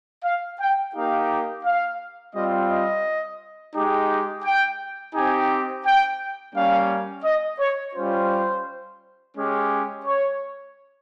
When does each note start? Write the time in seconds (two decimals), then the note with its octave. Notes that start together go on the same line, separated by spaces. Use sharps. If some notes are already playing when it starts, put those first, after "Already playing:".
0.25 F5
0.61 G5
0.95 A#3 D#4 G4 F5
1.65 F5
2.34 G3 C4 F4 D#5
2.69 D#5
3.75 G#3 D#4 G4
4.45 G5
5.15 C4 D#4 G4 G#5
5.86 G5
6.55 G3 A#3 C#4 F5
7.25 D#5
7.60 C#5
7.95 G3 C#4 F4 C5
9.35 G#3 C#4 G4
10.06 C#5